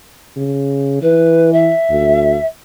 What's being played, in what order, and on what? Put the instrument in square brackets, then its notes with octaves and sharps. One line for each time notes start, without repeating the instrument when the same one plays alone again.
[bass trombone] C#3
[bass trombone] E3 [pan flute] B4
[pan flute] E5
[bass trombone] D2